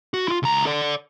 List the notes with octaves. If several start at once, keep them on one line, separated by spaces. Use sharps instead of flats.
F#4
E4 F4
C#2 A#5
A4 D5